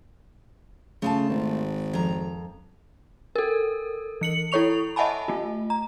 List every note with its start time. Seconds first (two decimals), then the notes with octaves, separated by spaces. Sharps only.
1.02 C#3 A3 F4 A5
1.29 G#1
1.93 F2 A#5
3.35 A4 A#4
4.21 E3 C#7 F#7
4.52 E4 A4 C#5 C#6 F7
4.96 D#5 E5 F#5 G#5 A5 B5
5.28 A3 F4
5.70 A#5